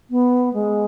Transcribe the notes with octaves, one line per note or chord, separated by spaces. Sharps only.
B3
G#3